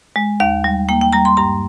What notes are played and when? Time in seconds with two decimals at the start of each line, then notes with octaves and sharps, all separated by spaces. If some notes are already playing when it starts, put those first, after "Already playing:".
0.16 G#3
0.40 D#2 F5
0.64 G3
0.89 A#3 G5
1.01 G5
1.13 G3 A#5
1.25 C6
1.37 G2 A#5